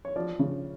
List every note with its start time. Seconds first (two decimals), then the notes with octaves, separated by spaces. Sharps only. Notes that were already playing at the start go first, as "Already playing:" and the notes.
0.05 C#5
0.16 F3 D5
0.39 C#3